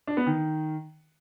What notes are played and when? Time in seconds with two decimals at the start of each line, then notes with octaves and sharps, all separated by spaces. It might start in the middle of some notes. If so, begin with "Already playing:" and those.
0.07 D4
0.17 B3
0.26 D#3